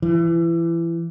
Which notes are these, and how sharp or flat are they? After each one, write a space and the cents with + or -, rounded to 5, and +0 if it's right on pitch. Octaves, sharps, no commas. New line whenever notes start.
E3 +25